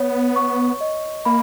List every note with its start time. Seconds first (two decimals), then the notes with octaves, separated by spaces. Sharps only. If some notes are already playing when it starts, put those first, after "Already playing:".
Already playing: B3 C#5
0.36 C#6
0.81 D#5
1.25 A#3 B5